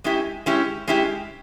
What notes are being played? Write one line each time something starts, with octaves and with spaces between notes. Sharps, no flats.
G#3 C#4 E4 G4
G#3 C#4 E4 G4
G#3 C#4 E4 G4